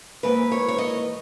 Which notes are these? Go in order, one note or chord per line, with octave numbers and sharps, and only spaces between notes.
G#2 E3 A#3 B4
C#5
C#5
D#5